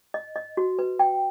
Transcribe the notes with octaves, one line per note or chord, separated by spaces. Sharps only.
D#5
D#5
F#4
B4
G5